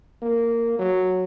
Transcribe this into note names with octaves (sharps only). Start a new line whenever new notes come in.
A#3
F#3